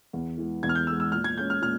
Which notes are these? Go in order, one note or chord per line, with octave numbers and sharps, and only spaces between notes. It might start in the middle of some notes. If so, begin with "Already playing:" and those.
E2
E3 G#3
E2 G#6
F6
G6
E3 G#3 E6
E6
A#2 F6
G#6
G#3 C#4 G6
F6
A#2 F6